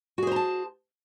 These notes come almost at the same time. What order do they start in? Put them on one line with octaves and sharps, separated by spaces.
F#4 G#4 C5 A#5 A5